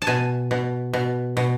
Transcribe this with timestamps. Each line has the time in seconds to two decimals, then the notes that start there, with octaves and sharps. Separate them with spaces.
0.02 A5
0.07 B2 G#5
0.51 B2
0.93 B2
1.37 B2